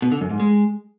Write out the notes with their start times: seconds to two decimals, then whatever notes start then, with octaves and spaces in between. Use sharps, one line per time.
0.02 B2
0.12 D3
0.21 F#2
0.30 G#2
0.40 G#3